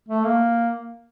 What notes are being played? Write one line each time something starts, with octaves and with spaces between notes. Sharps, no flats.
A3
A#3